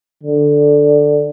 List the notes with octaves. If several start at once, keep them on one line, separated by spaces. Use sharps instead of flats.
D3